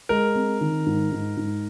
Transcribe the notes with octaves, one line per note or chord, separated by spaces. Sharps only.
G#3 A#4
C4
D#3
G#2
G#2
G#2